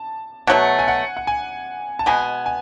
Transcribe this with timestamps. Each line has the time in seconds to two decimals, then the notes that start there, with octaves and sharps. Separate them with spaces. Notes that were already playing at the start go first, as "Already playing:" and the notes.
Already playing: A5
0.47 B2 F#3 A3 F#5
0.79 G#5
0.88 F#5
1.17 F#5
1.27 G#5
1.99 A5
2.06 B2 G#3 B3 G#5
2.46 G#5